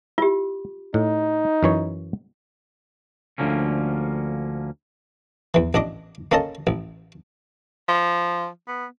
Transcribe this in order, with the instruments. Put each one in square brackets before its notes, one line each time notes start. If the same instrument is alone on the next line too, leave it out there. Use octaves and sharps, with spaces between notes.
[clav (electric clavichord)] E4 [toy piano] F4 G4
[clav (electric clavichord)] A2 [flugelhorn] D#4
[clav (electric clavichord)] F#2 E3 C#5
[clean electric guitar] D2 G#2 D3 F3 A#3 C#4
[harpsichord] E2 E3
A1 D4 D#5 D6
A#3 C#4 A4 D#5 A5
A1
[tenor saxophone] F3
B3